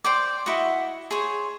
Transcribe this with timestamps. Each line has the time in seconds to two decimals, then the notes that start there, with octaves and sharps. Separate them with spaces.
0.04 C5 D5 G5 D6
0.46 E4 F#4 D#5 F#5
1.11 G#4 C5 C#5